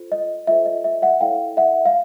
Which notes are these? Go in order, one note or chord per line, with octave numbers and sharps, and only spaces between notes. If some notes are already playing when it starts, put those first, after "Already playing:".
Already playing: F4 A4 C5
D#5
F4 A4 C5 E5
D#5
E5
E5 F#5
E4 A4 C#5 F5 G5
E5 F#5
F5